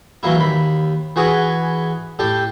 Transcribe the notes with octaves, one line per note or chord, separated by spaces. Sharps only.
E3 F#3 A#3 E4
D#2 B5
E3 F#4 G#4 B4
A2 G4 A5